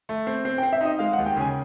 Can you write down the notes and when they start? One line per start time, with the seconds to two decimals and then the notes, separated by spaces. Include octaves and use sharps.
0.09 A3
0.27 C4
0.45 C4
0.58 G5
0.63 C4
0.73 E5
0.81 D#4 D#5
0.99 G#3 F5
1.13 F#5
1.18 D#2
1.26 G5
1.36 C#3 G#5